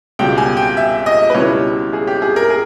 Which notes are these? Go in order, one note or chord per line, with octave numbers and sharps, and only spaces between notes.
C#2 B2 G3 G5
G#5
G5
E5
D#5
B4
C#2 B2 G3 C#4 E4 C#5
G#4
G4
G#4
A#4
G#4